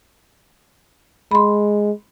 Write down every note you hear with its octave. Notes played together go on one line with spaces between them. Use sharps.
G#3 B5 C6